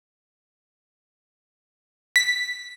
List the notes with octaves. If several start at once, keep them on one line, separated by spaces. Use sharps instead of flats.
B6